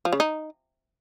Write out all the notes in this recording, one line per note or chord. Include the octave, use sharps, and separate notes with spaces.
F3
C#3
D#4